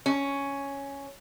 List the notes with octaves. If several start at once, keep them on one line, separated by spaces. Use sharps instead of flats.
C#4